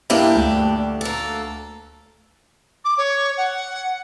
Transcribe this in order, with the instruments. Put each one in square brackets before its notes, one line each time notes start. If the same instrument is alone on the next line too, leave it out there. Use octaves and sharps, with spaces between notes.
[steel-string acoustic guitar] G2 D4 G4 [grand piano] A#3 E4
[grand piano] D2
[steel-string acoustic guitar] A#3 A4
[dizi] D6
C#5
F#5